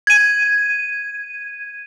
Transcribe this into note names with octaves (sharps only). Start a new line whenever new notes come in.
G#6 D#7